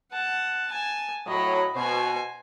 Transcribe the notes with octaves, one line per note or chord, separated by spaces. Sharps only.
F#5 A5
G#5 A5
A2 F#3 D#5 B5
B2 C5 G#5